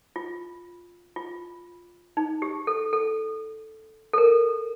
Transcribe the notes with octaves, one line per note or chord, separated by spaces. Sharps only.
F4
F4
D#4
G4
A4
A4
A4
A#4